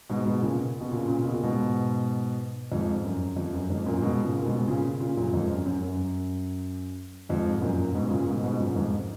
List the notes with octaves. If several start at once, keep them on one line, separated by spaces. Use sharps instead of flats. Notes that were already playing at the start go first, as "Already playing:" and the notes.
G#2 B2
G#2 B2
A#2 C#3
B2
A#2 C#3
A#2 C#3
B2
A#2
G#2 B2
F2 G#2
F#2
F2
F#2
F2 G#2
F#2 A#2
G#2 B2
A#2 C#3
A#2
G#2 B2
A#2 C#3
A#2 C#3
F#2 A#2
F2 G#2
F#2
F#2
F#2
F2 G#2
B2
F#2 A#2
G#2 B2
A#2 C#3
G#2 B2
G#2 B2
F#2 A#2
F2 G#2